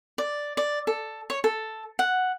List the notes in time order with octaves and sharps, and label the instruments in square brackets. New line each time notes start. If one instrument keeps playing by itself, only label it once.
[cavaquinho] D5
D5
A4
C#5
A4
F#5